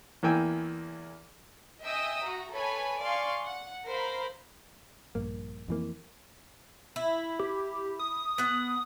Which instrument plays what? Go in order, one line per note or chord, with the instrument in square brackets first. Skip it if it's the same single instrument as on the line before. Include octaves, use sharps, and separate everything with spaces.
[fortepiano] E2 E3 A#3 G5 G#5 E6
[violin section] D#5 E5 G5 G#5 D#6 E6
F#4 A#5
A4 B4 C#5 G#5 B5
D5 F5 G#5 C6 C#6
F#5
A#4 C5 F5 B5
[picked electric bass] A#1 G2 A#3
F2 E3 A#3
[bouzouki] E4
[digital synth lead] G4
D#6
[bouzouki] B3 F#5